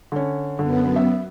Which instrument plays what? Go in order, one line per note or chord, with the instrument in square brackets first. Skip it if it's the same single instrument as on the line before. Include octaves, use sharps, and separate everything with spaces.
[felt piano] D3 C#4
[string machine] F#2 B3 [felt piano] D3
[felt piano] E5